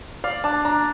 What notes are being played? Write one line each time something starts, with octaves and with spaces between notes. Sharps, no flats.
D5 F5
D4 A5
D4 A#5